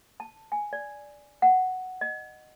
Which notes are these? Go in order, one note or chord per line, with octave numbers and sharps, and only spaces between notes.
A5
G#5
D5
F#5
D#5